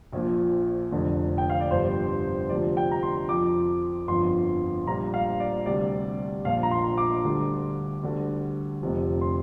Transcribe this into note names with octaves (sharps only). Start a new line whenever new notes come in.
A#1 A#2 F3
F1 F2 D3
G5
F5
D5
G1 F2 C3 G3 C5
D2 C3 F3 D5
G5
A#5
C6
F2 F3 D6
G1 F2 F3 C6
A#1 A#2 G3 A#5
F5
D5
D2 C3 G3 D5
A#1 A#2 F3 F5
A#5
C6
D6
D2 D3 G3
D2 D3 G3
F1 F2 C3 F3
C6